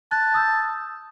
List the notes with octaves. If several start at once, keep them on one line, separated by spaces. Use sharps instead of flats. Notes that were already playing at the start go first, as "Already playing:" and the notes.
A5 F#6
D#6 E6 G6